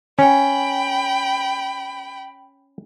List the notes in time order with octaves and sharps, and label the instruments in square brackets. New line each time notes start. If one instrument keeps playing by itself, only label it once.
[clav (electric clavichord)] C#4 [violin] G5 B5